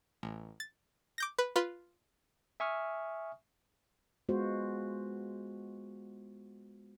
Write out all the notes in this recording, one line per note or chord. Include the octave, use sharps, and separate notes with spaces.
A1
A6
D6 G6 A#6
B4
F4 B4 C6
E5 G#5 C#6 D#6 F6
G#3 B3 F4 F#4 C5